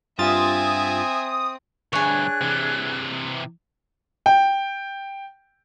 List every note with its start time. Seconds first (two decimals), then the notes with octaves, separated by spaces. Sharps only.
0.19 G2 C4 F4 E5 G#5 D#6 A6
1.93 D2 G2 D4 G#4 C#5 G#5 F#6
2.41 C3 E3
4.26 G5